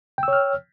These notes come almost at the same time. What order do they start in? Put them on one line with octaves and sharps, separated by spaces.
G5 E6 C#5 F6